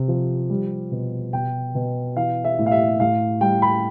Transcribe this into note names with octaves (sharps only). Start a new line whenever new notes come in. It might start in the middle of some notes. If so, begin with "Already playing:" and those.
Already playing: C3
F3
G3
B2
B2 G5
B2
E3 F5
E5
A2
F5
E5
A2 F5
G3 G5
B5